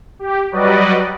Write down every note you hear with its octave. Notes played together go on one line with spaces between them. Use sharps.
G4
F#3 G3 F#4 B4 D5 D#5